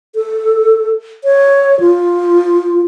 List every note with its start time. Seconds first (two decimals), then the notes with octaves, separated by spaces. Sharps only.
0.15 A4
1.24 C#5
1.80 F4